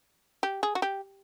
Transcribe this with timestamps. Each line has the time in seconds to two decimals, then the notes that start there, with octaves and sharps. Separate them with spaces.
0.43 G4
0.63 G#4
0.75 F#4
0.82 G4